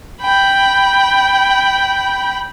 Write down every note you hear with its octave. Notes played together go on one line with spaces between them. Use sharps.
G5 B5